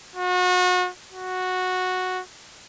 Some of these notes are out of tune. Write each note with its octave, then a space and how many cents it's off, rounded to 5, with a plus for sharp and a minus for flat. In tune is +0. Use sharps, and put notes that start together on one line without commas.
F#4 -35
F#4 -10